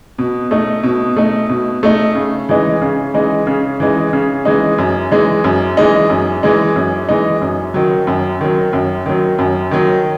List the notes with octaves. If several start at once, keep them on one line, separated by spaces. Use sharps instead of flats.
B2
A3 D#4
B2
A3 D#4
B2
A3 D#4
C#3
E3 G#3 D#4
C#3
E3 G#3 D#4
C#3
E3 G#3 D#4
C#3
E3 G#3 D#4
F#2
E3 G#3 D#4
F#2
E3 G#3 D#4
F#2
E3 G#3 D#4
F#2
E3 G#3 D#4
F#2
D#3 F#3
F#2
D#3 F#3
F#2
D#3 F#3
F#2
D#3 F#3